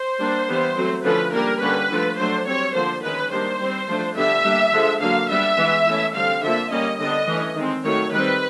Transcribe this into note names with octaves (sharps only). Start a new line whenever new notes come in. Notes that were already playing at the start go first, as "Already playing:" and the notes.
Already playing: C5
G3 A#3 D4
E3 G3 B3
F#3 A3 C4
D3 F3 A3 C#4 B4
G3 A#3 D4 A#4
D3 G3 A#3 C#4 B4
D3 F3 A3
F#3 A3 D4 C5
G3 C4 C#5
D3 F3 A#3 C5
D#3 G#3 C#4 B4
D#3 G3 A#3 D4 C5
G3 C4
F3 A3 D4
D3 G3 B3 D4 E5
G3 A#3 D4
D3 F3 G#3
D3 F#3 A#3 F5
G3 B3 D4 E5
E3 G#3 B3
E3 A3 C#4
D3 G3 C4 F5
D3 F3 A#3 E5
G3 A#3 C#4 D#5
D3 G3 B3 D4 D#5
E3 A3 C#4
D#3 G#3 C4
D#3 F#3 A3 C#5
D#3 G3 C4 B4